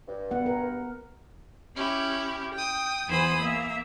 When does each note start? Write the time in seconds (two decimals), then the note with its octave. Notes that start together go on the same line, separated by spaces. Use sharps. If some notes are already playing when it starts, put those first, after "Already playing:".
0.07 G2
0.31 B3 F#5
0.46 A#4
1.74 C#4 E4 G4
2.54 G5 D#6
3.08 E2 E3 C5 G#5 B5 D#6
3.40 A#3 E5